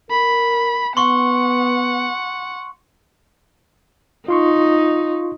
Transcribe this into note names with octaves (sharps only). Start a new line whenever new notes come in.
A#4 B5
B3 F#5 C6 C#6
D#4 F4 C6 C#6